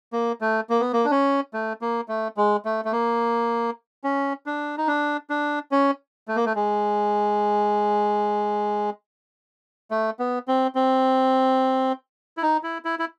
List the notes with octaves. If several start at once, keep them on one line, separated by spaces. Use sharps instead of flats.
A#3
A3
A#3
B3
A#3
D4
C#4
A3
A#3
A3
G#3
A3
A3
A#3
C#4
D4
D#4
D4
D4
C#4
A3
A#3
A3
G#3
A3
B3
C4
C4
E4
D#4
E4
E4
E4